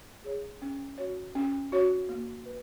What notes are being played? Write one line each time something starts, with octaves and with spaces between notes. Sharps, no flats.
G#4 C#5
C#4
F#4 C#5
C#4
F#4 C#5
A#3
B4